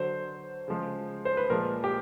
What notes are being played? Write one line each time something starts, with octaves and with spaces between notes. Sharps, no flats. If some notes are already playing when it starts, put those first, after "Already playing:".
Already playing: D3 F#3 C5
C#3 F3 G#3
C5
B4
A#2 F3 G#3 A#4
G4